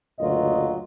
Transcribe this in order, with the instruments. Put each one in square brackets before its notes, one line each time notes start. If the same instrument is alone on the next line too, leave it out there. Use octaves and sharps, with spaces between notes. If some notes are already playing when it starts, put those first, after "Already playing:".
[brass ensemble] F#1 D2 A#2 F#3 F4 D#5